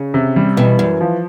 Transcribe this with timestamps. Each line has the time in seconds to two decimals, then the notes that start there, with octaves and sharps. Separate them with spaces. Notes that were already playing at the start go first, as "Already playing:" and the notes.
Already playing: C#3
0.14 C3
0.36 G3
0.57 B2 E3
0.79 F#2 E3
1.01 F3